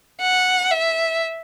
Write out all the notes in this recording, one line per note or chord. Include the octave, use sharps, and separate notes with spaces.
F#5
E5